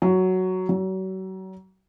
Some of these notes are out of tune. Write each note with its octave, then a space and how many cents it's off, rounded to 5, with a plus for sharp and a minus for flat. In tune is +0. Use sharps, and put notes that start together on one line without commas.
F#3 +5
F#3 +35